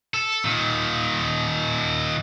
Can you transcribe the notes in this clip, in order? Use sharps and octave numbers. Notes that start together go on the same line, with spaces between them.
A4
A#2 D#3